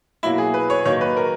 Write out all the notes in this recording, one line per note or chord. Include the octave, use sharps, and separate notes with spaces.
B2 F#3 A#3 E4
G#4
B4
C#5
D#3 F#3 A#3 C#5
B4
A#4